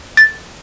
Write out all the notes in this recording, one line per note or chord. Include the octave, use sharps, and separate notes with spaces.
A6